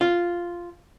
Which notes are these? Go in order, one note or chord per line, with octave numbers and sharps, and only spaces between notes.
F4